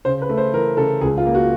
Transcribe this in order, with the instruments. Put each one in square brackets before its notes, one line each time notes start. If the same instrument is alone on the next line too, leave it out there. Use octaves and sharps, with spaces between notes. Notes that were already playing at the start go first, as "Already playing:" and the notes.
[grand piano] C#3 C5
B4
A3
C5
E3 A#4
C#3 A4
C#2 G#4
F4
A#3
F#4